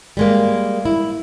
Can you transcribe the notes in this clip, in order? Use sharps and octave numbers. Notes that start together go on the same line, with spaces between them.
G3 G#3 A#3
E4